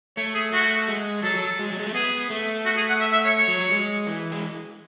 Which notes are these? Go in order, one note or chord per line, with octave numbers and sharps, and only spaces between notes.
A3 C#5
G#4
A3 F#4
G#3
F#3 A4
F#3
G#3
F#3
G#3
A3
B3 G#4
A3
F#4
G#4
F#5
E5
E5
C#5
C#5
F#3
F#3
G#3
E3
G#3